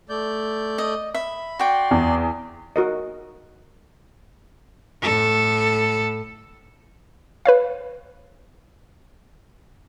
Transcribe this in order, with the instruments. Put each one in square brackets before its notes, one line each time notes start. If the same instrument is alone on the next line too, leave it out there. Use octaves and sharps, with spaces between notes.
[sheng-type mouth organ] A3 D5 G6
[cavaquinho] D#5
[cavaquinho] E5 [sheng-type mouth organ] B5
[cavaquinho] F#4 G5 [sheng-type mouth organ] D5 C6
[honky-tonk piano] E2
[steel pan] F#4 A#4 D#5
[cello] A2 A4
[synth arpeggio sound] B4 C#5 F5